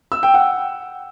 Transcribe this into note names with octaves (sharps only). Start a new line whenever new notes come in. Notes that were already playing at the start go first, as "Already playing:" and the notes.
E6
G5
F#5